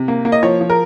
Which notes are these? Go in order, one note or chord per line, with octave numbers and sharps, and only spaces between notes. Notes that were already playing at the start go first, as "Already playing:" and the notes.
Already playing: C3
A#3
A#3
D#5
F3 C#5
F3
A#4